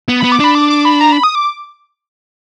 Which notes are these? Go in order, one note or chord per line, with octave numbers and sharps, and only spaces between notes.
B3
B3 B5
D6
D4 B5
D6
D6
B5
A#5
B5
D#6
D6